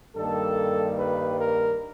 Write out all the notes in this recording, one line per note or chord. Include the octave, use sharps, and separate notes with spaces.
G2 D#3 G3 A#3 A4
B4
A#4